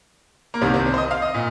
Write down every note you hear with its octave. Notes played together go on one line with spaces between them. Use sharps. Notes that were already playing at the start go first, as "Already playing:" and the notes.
A#3
C2 C3 D#3 C4
C4
C4
C5
D#5
F5
D#5
A#2